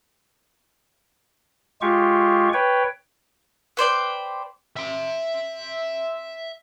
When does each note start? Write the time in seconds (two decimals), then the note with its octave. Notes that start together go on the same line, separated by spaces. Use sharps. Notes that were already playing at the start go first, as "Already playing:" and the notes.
1.82 G#3 F4 G4 C#6
2.54 B4 C#5 G5
3.77 B4 C5 D5 G5
4.76 E5 C6